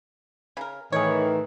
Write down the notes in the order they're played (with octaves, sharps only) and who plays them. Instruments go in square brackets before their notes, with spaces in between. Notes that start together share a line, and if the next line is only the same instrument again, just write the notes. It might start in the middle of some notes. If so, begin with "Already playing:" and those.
[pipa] C#3 A#4
[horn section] A2 D#3 E3 [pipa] G#4 C#5